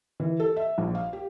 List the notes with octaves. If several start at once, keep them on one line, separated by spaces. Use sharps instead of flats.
E3
A4
E5
A#1
F5
G4